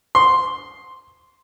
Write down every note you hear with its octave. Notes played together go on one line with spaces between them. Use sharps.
C6